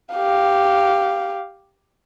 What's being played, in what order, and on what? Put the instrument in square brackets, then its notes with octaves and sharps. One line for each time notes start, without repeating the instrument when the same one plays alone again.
[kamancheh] G4 F5